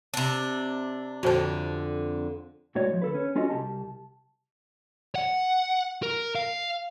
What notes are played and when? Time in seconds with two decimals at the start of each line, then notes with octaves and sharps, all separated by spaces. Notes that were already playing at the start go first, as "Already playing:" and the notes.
0.14 C3 D4
1.23 F2 D3 F#4 C5 A5
2.75 C2 A2 G#3 F#4 C#5 D5
2.90 E3 F3
3.02 D2 A4 B4
3.14 C#4
3.36 C#4 F4 F#4 A4 D#5
3.50 C2 F2 G4 A5
5.15 F#5
6.03 A#4
6.35 F5